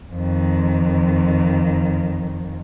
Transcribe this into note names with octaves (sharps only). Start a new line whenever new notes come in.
F2 D#3